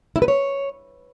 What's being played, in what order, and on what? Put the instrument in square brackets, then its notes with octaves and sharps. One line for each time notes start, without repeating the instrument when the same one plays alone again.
[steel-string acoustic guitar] E4
B4
C#5